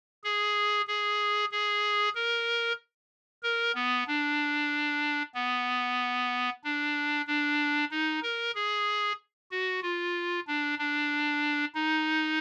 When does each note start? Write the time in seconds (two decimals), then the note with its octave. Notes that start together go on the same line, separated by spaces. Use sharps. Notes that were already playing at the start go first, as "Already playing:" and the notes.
0.24 G#4
0.87 G#4
1.51 G#4
2.15 A#4
3.43 A#4
3.75 B3
4.07 D4
5.35 B3
6.64 D4
7.27 D4
7.91 D#4
8.22 A#4
8.55 G#4
9.51 F#4
9.83 F4
10.47 D4
10.78 D4
11.75 D#4